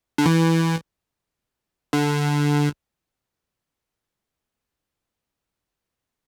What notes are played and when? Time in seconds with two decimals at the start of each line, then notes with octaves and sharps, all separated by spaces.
0.18 D3
0.26 E3
1.93 D3